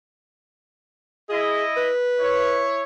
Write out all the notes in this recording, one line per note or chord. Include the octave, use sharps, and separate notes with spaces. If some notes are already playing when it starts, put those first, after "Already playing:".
E4 G#4 D#5
B4
E4 C#5